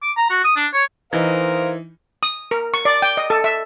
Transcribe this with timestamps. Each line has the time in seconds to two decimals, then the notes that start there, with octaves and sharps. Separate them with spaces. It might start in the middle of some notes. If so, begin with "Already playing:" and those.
0.02 D6
0.17 A#5
0.30 F#4
0.44 D#6
0.56 D4
0.73 C#5
1.13 E3 D#4 A#4 C5 D#5 F5
2.23 D#6
2.51 A#4
2.74 C#6
2.85 D5
3.02 G5
3.17 D#5
3.30 A4
3.44 E5